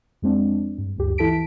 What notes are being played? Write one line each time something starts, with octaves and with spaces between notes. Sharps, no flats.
F2 G#3 C4 D4
G2
G#1 D2 G2 G4
E3 E4 A4 A5 B6 D7